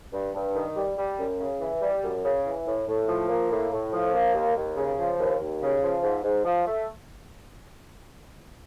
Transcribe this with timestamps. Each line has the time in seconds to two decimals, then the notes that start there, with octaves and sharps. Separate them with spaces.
0.13 G2
0.34 G2
0.55 D#3
0.76 G3
0.98 G3
1.19 F#2
1.39 C#3
1.60 E3
1.81 G3
2.03 F#2
2.24 C#3
2.45 E3
2.67 A2
2.87 A2
3.08 F3
3.29 A#3
3.51 A2
3.72 A2
3.93 F3
4.14 A#3
4.34 D#2
4.56 D#2
4.76 C#3
4.98 F3
5.19 D#2
5.40 D#2
5.61 C#3
5.82 F3
6.02 G#2
6.23 G#2
6.45 F3
6.67 A3